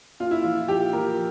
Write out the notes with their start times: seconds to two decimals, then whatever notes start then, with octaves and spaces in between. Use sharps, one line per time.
0.20 A#2 F4
0.31 E4
0.43 F3 F4
0.68 A#2 G4
0.93 F3 A#4